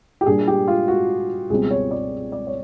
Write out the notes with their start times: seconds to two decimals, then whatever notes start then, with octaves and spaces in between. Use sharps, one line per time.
0.21 G4
0.26 A#2 G3 A#3 D4 G#4
0.47 G4
0.68 F4
0.88 F#4
1.50 C#2 B2 G3 C4 G#4
1.71 C#5
1.91 D5
2.32 D5
2.47 C#5